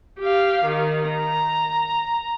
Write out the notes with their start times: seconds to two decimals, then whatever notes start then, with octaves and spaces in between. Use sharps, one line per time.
0.20 G4 F5
0.65 D#3
1.09 A#5